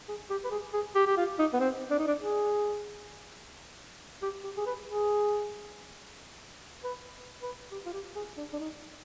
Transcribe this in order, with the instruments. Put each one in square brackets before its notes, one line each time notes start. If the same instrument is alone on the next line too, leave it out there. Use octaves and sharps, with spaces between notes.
[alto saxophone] G#4
G4
B4
G#4
G#4
G4
G4
F4
D#4
B3
C4
D4
D#4
D4
G#4
G4
G4
G#4
B4
G#4
B4
B4
G4
F4
G4
G#4
D4
D4
D#4